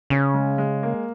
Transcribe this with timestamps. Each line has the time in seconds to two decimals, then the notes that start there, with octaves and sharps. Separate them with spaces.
0.10 C#3 C#4
0.34 G#3
0.58 G#3
0.83 A#3